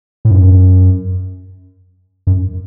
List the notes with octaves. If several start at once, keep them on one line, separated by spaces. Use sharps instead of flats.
A2
F#2
F#2